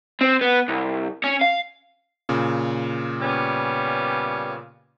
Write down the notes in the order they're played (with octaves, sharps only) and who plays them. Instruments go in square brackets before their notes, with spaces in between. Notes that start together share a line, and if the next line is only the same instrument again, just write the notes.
[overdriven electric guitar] C4
B3
C2
C#4
F5
[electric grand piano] A#2 C#3
[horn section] G3 B3 C#4